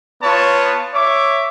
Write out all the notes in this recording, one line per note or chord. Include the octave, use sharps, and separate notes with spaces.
B3 F4 C#5 A5
C#5 E5 D6